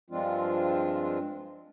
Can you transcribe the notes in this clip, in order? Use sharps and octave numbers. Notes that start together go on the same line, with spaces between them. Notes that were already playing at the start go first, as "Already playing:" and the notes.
G2 F3 G#3 C4 D4 F4